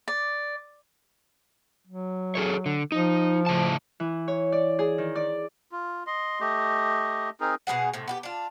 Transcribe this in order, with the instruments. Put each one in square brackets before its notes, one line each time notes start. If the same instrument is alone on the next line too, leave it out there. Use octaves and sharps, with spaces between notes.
[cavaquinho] D5
[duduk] F#3
[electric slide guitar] G#4 A4 C#5
D3
[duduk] F3 [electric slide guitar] D#4
[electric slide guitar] A2 C#3 A5
[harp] E3
C#5
D5
G#4
D#3
D5
[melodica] F4
D#5 C6
A3 G4 D#5
C4 D#4 G#4 A#4
[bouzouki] B2 A#3 G#4 F#5
A2 C3
B3 F4 G4
D4 F4